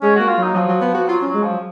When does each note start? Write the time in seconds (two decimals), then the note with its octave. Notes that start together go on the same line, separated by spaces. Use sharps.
0.02 G#3 C#4
0.15 A#3 F#4
0.28 F4
0.37 F#3 D#4
0.55 F3 F#3
0.68 F#3
0.81 B3
0.94 F#4
1.08 F#3 F4
1.22 C#4
1.26 F#3
1.34 G#3
1.43 F3
1.48 F#3